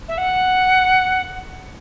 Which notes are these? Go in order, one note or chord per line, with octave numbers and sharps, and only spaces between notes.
E5
F#5